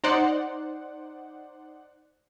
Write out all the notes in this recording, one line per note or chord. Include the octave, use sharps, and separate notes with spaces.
D#4 C5 D5 F#5